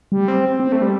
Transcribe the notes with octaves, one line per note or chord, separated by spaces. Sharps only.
G3
C4
C4
A3
G3